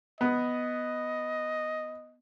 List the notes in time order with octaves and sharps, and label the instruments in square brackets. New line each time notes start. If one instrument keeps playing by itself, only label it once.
[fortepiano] B3 [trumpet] D#5